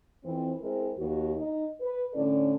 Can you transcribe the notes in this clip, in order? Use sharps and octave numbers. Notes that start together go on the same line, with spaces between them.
F2 E3 C4
G#3 C4 E4 A#4
D#2 F#4
D#4
B4
A2 D3 C#4 A4 D5